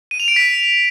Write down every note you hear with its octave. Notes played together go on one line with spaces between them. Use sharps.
D#7
F7
D7
B6